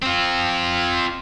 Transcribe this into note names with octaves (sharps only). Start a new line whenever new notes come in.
C4 F4